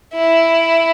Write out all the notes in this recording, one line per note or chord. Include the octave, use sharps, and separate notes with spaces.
E4